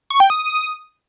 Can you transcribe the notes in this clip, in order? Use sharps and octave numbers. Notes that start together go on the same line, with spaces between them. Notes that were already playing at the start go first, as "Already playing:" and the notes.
C#6
G5
D#6